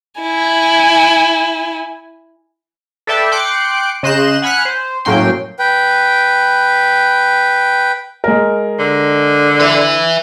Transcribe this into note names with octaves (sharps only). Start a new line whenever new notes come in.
E4 G#5
A4 B4 D5 E5 G5 A5
G5 C6 D6 F#6 C#7
C#3 D#5 C6 F#6 G6 E7
F#5 G#5 B5 F6 F#6
C5
A2 F#3 A#3 C#4 G5 C6
B4 G5
G#3 A#4
D3
B4 E5